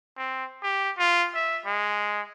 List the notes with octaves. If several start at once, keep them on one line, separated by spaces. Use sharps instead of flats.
C4
G4
F4
E5
G#3